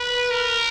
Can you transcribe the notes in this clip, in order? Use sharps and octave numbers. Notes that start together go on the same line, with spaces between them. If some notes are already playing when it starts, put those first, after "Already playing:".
Already playing: B4
A#4